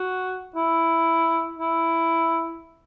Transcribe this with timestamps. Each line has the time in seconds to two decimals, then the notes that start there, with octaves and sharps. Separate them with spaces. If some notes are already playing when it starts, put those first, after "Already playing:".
Already playing: F#4
0.55 E4
1.59 E4